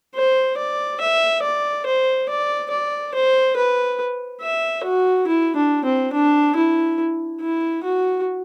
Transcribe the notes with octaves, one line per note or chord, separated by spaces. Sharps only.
C5
D5
E5
D5
C5
D5
D5
C5
B4
E5
F#4
E4
D4
C4
D4
E4
E4
F#4